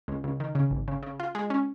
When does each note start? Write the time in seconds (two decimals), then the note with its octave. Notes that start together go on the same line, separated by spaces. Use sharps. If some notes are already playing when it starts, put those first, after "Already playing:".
0.08 C#2
0.24 C#2
0.40 D#3
0.55 C#3
0.71 G#1
0.88 C#3
1.03 C#3
1.20 F4
1.35 G#3
1.50 C#4